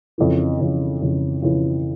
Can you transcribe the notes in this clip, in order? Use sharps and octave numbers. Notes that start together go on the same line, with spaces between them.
F2 C#3 E3
F2 C#3 E3
F2 C#3 E3
F2 C#3 E3